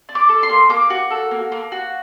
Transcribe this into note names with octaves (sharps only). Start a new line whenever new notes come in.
D4
D6
A4
C6
A#3
A#3 D6
F#4
A4
A#3
A#3
F#4